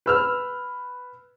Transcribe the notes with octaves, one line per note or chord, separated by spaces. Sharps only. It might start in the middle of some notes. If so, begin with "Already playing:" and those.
B4 E6 F6